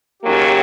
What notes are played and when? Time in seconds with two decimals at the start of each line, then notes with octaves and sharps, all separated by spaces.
0.22 D#2 C#3 F#3 A#3 G4